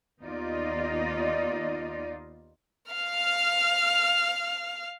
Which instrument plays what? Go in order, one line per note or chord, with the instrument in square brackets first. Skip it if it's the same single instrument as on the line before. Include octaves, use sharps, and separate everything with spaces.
[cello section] D#2 B3 D#4 F4 D5 D#5
[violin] F5 F6